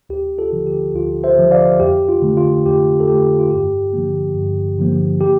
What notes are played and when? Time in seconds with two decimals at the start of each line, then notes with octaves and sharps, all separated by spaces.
0.09 D2 G4
0.38 F4 A4
0.52 D3 F3
0.67 G4
0.94 D2 F4
1.24 C5 E5
1.38 D3 F3
1.51 D5 F5
1.80 F2 G4
2.09 F4
2.22 D3 A3
2.37 F4
2.66 F2 G4
3.00 A4
3.08 D3 A3 G4
3.39 F4
3.50 G2 G4
3.93 D3 F3 A#3
4.35 G2
4.79 D3 F3 A#3
5.21 G4